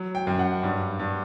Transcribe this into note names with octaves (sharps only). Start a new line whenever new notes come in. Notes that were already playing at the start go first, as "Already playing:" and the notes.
Already playing: F#3
G5
F#2
F#5
G2
G2